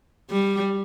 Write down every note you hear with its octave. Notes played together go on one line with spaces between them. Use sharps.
G3